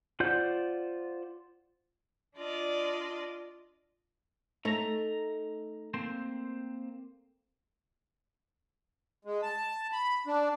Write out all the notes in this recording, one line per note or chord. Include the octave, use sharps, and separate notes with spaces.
F4 C5 D5 F#5 G6
D4 F4 D5 D#5
A3 D#4 A#5
A#3 C4 C5
G#3
A5
B5
D4